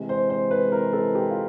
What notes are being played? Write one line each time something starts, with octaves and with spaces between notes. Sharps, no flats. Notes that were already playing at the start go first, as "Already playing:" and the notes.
Already playing: C3 E3 G#3
C5
C5
B4
A#4
A4
G4
F4